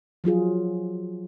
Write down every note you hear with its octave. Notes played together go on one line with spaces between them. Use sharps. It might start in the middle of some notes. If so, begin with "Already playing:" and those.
F3 F#3 F4 G#4